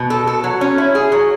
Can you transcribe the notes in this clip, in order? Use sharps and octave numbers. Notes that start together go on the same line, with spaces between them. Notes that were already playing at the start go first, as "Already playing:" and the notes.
Already playing: B2
A4
A4
F#3
C#4
E4
G#4
F#3